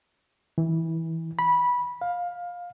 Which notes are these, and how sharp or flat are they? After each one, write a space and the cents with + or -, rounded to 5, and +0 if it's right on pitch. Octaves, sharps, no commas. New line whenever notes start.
E3 -20
B5 -15
F5 +15